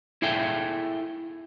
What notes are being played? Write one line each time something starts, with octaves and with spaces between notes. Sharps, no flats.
E4 G#4 A4 E5 G5